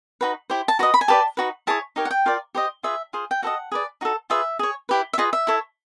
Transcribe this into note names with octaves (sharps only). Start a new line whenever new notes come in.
D#4 F#4 B4
E4 G4 C5
A5
F#4 B4 D#5 A#5
B5
G#5
G4 B4 D5 A5
D#4 F#4 B4
E4 G#4 C#5 A5
D#4 G4 A#4 C#5
F#5
G5
F4 A#4 D5
G4 C5 D#5
F4 G#4 B4 E5
F4 G#4 C5
G5
F#4 A4 C5 D#5 F#5
G#4 B4 D5
D#4 F#4 A4
F4 G#4 B4 E5
G#4 C#5
E4 G4 B4
E5
F4 G#4 B4 D#5
E5
E4 A4 C#5